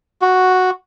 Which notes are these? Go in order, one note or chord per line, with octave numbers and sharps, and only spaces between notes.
F#4